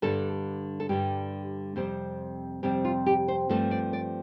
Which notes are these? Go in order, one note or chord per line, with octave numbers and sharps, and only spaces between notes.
G2 D3 G3 A4
A4
G2 D3 G3 G4
F2 C3 G3 C4
F2 C3 G3 C4 G4
F4
G4
C5
G2 F3 A3 C4 A4
D5
D5